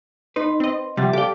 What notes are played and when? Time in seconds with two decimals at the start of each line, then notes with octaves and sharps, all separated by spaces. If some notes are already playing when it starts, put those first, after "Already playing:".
0.36 D#4 B4 C6
0.60 C4 D#5
0.97 C3 F3 G3 F#5 A6
1.13 G4 A4 D5 F5 G5 D6